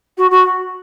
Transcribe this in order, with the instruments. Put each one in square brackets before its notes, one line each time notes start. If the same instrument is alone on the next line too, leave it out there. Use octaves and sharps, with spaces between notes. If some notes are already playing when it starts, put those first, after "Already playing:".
[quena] F#4
F#4